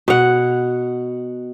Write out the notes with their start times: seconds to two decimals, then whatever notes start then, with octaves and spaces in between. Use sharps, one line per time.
0.08 B2 F#5